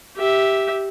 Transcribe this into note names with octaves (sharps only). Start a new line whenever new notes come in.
G4 E5